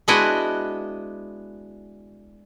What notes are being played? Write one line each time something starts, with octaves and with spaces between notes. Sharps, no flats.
G#3 B3 D4 E4 F#4 D#5